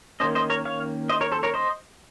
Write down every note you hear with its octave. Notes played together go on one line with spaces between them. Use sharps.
D#3 A#3 C#4 C5 D#5
C5 D#5
A#4 C#5
C#5 F5
C5 D#5
A#4 C#5
A4 C5
A#4 C#5
C5 D#5